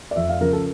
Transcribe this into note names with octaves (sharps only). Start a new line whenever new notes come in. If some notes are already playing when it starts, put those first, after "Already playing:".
D5
F2 E5
F5
C#3 F3 A#4
A4